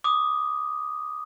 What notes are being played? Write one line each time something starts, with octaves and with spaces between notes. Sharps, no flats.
D6 D#6